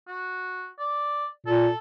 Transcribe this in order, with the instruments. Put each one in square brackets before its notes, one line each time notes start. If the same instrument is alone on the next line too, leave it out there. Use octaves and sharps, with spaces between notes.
[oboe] F#4
D5
[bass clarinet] A#2 [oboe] A4